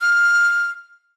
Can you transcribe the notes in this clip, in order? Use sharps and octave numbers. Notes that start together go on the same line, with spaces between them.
F6